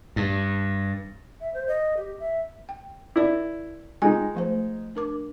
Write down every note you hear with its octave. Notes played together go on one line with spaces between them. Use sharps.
G2
E5
C5
D#5
G4
E5
G5
E4 A#4 D5
G#3 D#4 F4 G5 G#5
F3 A3 C5
D4 A#4 D6